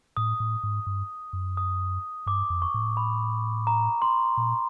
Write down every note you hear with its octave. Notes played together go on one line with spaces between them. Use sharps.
A2 D#6
A2
G#2
G2
F#2
D#6
G2 D6
F2
C#6
A2
B5
A#5
C6
A#2